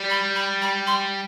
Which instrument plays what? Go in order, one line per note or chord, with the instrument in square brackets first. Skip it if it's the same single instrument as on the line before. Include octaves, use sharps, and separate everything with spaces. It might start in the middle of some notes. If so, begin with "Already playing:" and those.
Already playing: [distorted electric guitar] G3
[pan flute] B5
B5
B5
C6